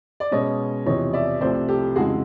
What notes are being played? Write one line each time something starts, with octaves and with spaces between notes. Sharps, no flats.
D5
B2 G#3 C#4 C#5 D#5
E2 C3 F3 C#5 D#5
D5 E5
C2 C3 F3 A3 C5 D5
G4 A4
F2 C#3 E3 G#3 F#4 G#4